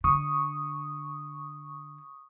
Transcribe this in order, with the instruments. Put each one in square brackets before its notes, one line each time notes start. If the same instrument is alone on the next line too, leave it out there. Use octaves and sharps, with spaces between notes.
[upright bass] D3 [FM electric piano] C#6 D#6